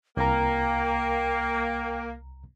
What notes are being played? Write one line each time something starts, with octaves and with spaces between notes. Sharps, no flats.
C2 A#3 G5 A#5